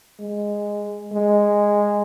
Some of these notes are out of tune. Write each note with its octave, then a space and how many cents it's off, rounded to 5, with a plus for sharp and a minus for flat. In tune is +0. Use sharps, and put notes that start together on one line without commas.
G#3 -10
G#3 -10